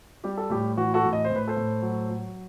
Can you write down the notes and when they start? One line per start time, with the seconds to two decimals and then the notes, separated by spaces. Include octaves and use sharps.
0.24 G3 G4
0.37 A4
0.50 A2 G4
0.77 E3 F#4
0.94 F#4 A4
1.04 A2
1.13 D#5
1.25 C5
1.30 A2
1.36 B4
1.48 A4 C5
1.56 A2
1.82 F#3
2.10 F#3